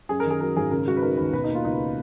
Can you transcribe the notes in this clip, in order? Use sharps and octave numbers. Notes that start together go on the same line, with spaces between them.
F#2 G#4
D#3 A#4
G#4
F#3 A#4
G#1 G#4
C#3 A#4
G#3 F#4
B4
D#4 A#4
D#2 B4
B2 B4
A#3 D#4
F4
C#2 D#4